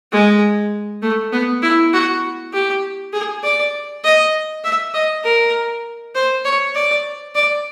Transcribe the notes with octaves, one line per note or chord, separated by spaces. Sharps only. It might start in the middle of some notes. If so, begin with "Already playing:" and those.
G#3
A3
B3
E4
F#4
G4
G#4
D5
D#5
E5
D#5
A#4
C5
C#5
D5
D5